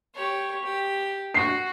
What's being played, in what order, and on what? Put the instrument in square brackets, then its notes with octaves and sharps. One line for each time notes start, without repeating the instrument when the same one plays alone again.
[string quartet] G4 C#5
G4
[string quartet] F#4 [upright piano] C7